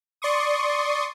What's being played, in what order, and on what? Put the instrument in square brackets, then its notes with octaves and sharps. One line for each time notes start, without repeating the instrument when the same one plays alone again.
[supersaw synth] D5 C6 C#6 D#6